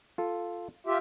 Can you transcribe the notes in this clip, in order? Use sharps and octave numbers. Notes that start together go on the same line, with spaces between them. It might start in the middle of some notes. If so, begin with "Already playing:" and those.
F4 A4
F4 G4 E5